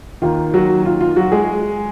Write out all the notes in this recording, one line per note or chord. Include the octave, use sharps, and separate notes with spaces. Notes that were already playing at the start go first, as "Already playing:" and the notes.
D#2 D#3 A#3 F4
F#3 F#4
F4
F4
F#3 F#4
G#3 G#4